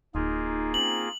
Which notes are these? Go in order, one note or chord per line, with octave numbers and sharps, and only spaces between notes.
D1 A#3 D#4 F4 G#4
C4 C#4 D#4 F#7